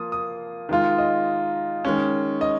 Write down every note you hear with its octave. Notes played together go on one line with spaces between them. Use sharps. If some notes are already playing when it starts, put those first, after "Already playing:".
Already playing: F3 A#3 F4 D#6
D#6
D#3 G#3 F4
D#5
D#3 G#3 C#4
D#5